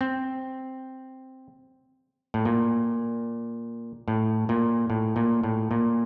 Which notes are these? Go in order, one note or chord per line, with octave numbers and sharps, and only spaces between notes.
C4
A2
A#2
A2
A#2
A2
A#2
A2
A#2